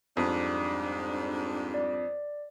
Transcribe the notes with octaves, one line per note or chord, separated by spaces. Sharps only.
F2 G#2 G3 D4
D5